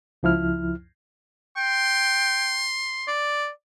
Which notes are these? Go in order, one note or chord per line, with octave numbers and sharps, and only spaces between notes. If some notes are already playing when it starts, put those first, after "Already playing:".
C#2 F3 E4 F6
G5 C6
D5